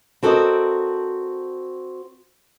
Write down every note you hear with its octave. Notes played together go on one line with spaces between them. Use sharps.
C4 F#4 A4 A#4 D5 D#5